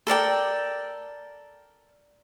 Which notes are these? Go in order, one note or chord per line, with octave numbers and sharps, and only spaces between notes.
A4 A#4 D5 G5